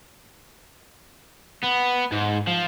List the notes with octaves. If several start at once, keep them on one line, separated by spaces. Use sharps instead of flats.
B3
G#2
F3